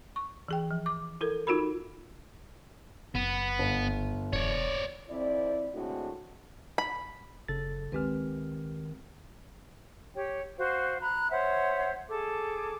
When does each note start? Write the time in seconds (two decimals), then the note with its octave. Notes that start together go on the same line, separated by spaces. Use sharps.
0.16 C#6
0.48 E3 G#4 G5
0.71 F3
0.86 D6
1.21 E4 A4 A#4
1.47 D#4 F4 F#4 A#4 B5
3.15 F#1 B3
3.59 G1
4.33 E1 C#5 D5
5.09 F2 C4 E4 D5
5.74 A2 D3 G#3 C4 D4 F#4
6.78 B5
7.48 F#1 C#3 A4 A6
7.92 C#2 D#3 G#3 C4 G4 B4 F6
10.15 G4 C#5 G5
10.58 F#4 C5 F5 F#5
11.01 A#5 B5 F#6
11.31 C5 C#5 E5 F#5
12.10 G#4 A4 D6